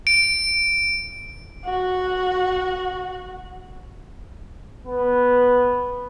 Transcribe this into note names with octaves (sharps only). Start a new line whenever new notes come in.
D7
F#4 F#5
B3